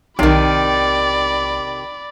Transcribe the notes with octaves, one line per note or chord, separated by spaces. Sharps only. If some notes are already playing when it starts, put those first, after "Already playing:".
B1 C3 D#3 D5 B5